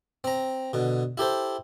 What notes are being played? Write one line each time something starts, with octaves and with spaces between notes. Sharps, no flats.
C4 A#5
B2 D3
E4 G4 A4 C5